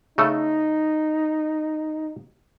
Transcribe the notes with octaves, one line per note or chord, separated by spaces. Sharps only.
C#3 A3 D#4 A4